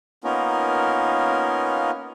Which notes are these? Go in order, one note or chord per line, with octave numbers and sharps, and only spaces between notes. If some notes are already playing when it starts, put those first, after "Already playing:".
A#3 B3 C#4 D#4 F4 A#4